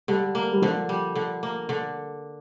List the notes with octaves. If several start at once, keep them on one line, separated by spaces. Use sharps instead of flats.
D3 G3
A#3
G3
D3 F3
G3
D3
A#3
D3